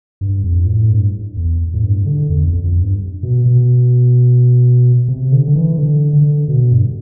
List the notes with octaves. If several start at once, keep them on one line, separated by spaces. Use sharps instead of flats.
G2
F2
A2
G2
E2
A2
G2
D3
E2
F2
F2
G2
B2
B2
C3
D3
D3
E3
D3
D3
B2
G2